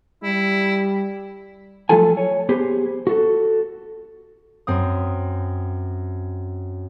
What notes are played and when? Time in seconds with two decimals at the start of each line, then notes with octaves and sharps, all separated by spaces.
0.24 G3 E4
1.89 F3 F#3 A3 F4 A4 G#5
2.17 C#5
2.49 B3 G4 G#4 C5
3.07 F#4 A4
4.67 F#2 C4 D#6